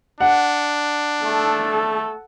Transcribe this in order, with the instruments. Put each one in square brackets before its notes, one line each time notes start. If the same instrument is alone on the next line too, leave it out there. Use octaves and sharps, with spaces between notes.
[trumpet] D4 [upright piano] F#5
[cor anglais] A3 [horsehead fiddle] A4